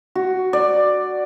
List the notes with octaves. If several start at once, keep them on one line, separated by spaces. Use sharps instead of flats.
F#4
D5